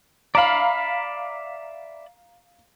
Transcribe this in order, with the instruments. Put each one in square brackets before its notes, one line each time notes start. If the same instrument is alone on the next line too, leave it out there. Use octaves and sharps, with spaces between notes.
[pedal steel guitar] D5 E5 B5 [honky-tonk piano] F5 A#5